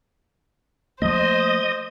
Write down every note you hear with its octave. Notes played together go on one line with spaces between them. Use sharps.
F3 A3 A#3 C5 D#5